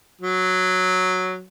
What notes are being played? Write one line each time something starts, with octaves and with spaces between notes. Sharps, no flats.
F#3